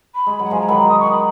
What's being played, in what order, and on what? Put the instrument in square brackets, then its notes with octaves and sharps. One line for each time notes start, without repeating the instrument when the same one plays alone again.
[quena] B5
[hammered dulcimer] G#3
F#3
[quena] F#5
[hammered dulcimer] F3 G#3 [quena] G#5
[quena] A#5
[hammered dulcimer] D#3 F#3 [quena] B5
[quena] D#6
C#6
B5